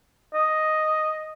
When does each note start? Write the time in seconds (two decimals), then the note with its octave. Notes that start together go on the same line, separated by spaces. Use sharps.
0.34 D#5